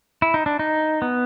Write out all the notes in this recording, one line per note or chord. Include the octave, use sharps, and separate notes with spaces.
E4
D#4
D4
D#4
B3